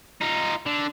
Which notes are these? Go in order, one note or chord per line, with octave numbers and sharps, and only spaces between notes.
D#4 F4
D3